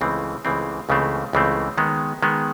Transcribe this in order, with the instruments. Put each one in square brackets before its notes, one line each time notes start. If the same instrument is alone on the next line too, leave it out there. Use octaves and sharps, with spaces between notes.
[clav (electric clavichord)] C#2 C#3 E3 A3 C4
C#2 C#3 E3 A3 C4
C#2 C#3 E3 A3 C4
C#2 C#3 E3 A3 C4
D#3 G#3 B3
D#3 G#3 B3